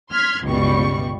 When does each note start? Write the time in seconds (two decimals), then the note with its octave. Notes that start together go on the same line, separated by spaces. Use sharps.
0.11 C6 F6 G#6 B6
0.45 G1 C#2 B2 G3 C#6